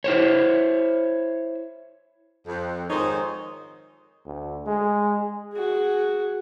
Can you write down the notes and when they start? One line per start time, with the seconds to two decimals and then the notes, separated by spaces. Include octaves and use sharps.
0.04 E4 C5 C#5
2.47 F2
2.90 G#2 D#3 D#4 G#4 C5 C#5
4.26 D2
4.66 G#3
5.53 F#4 G#4